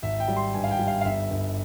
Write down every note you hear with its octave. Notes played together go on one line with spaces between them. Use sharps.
G#1 E5
G5
G3
C6
G2 G#5
F5
G5
G3
F5
F5
G1 E5
G1